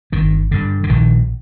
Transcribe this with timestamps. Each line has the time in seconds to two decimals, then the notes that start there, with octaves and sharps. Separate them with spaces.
0.12 G1 D#3
0.51 G2 D3
0.83 D3
0.89 A#1 D#3